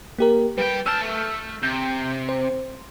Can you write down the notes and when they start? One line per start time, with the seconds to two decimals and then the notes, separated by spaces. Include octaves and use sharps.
0.18 A#3 G4 A#4
0.58 G3 B4 G5
0.86 C#4 A5 E6 F6 G6
1.01 A3
1.63 C3 G6
2.29 C5